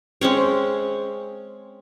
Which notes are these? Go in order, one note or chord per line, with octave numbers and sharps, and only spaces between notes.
G#3 C4 C#4 C#5